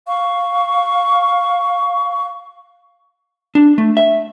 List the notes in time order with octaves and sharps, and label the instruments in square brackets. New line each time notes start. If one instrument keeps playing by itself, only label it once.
[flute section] F5 C#6
[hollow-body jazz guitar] D4
A3
E5